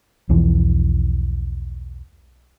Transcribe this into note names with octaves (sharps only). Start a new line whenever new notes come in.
B1 E2 E3 F3